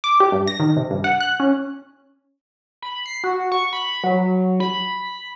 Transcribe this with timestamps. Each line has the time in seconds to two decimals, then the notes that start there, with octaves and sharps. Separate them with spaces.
0.04 D6
0.20 G4
0.32 G2
0.47 A#6
0.60 D#3
0.77 C3
0.91 G2
1.04 F#5
1.20 F#6
1.40 C#4
2.82 B5
3.06 C7
3.24 F#4
3.52 C#6
3.73 B5
4.04 F#3
4.60 B5